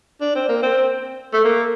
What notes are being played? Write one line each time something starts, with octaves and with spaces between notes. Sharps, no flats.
D4
C4
A#3
C4
A3
A#3